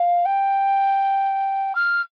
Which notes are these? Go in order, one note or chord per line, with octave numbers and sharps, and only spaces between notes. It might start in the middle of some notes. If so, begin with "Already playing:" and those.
Already playing: F5
G5
F6